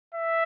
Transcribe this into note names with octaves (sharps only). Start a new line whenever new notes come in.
E5